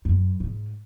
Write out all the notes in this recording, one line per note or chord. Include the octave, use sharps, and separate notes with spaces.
F#2
G#2